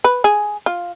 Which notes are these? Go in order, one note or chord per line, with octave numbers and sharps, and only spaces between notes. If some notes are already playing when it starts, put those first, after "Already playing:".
B4
G#4
F4